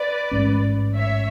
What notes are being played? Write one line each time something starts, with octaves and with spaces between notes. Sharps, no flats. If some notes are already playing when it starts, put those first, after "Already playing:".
Already playing: B4 D5
A1 G#2 G#3 C#4
C#5 E5